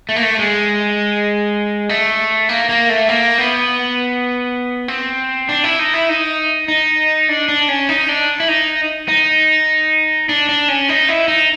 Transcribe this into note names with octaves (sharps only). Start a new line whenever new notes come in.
A3
A#3
A3
G#3
A3
A#3
A#3
A3
A#3
B3
C4
D4
E4
D#4
E4
D#4
D#4
D4
D4
C#4
D#4
D4
E4
D#4
D#4
D4
D4
C#4
D#4
E4
D#4